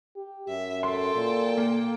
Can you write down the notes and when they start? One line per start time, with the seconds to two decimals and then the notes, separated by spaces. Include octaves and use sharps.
0.16 G4
0.48 F#2 E5
0.83 A4 G5 C6
1.15 A#2
1.58 A#3